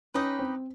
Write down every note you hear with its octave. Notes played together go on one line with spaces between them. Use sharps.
C#4 D#4 G4 B4 D#5
C4